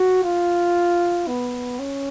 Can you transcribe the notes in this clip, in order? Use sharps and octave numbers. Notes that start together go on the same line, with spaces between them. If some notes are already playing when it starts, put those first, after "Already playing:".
Already playing: F#4
F4
B3
C#4